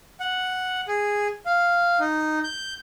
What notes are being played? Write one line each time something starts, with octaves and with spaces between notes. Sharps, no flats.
F#5
G#4
F5
D#4
G6